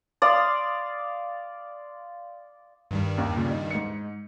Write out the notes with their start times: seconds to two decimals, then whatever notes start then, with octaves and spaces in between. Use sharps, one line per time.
0.22 D5 F5 C6 D#6
2.91 G2 D#3 G3
3.18 D#2
3.36 A#2 C#3
3.51 D#4
3.71 G#2 D#5 C#7